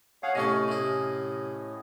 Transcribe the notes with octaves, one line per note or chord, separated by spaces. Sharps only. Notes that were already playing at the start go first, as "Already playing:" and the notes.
G#4 C#5 F5 F#5
A2 C3 A3 C#4 A4 D#5
C3 E4